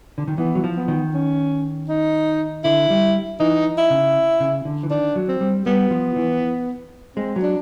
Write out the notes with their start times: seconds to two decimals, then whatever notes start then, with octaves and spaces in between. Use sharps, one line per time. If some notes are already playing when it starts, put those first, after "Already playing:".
0.18 D3
0.28 D#3
0.38 E3 B3
0.55 F#3
0.64 F3
0.77 B3
0.88 D#3
1.14 C#4
1.89 D#4
2.64 D3 E4
2.90 G3
3.40 E3 D#4
3.78 E4
3.90 C#3
4.40 C#3
4.65 D3
4.83 E3
4.90 D#3 D4
5.16 F#3
5.28 C4
5.41 G3
5.66 G3 B3
5.91 F3
6.16 E3
7.16 G#3 C4
7.36 F#3
7.42 D4